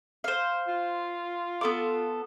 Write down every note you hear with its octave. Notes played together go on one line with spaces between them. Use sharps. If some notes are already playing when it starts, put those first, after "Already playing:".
C5 F5
F4
B3 A4 D6